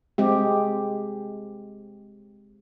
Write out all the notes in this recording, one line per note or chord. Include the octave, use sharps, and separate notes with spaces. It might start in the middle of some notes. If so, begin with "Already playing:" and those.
G#3 C4 G4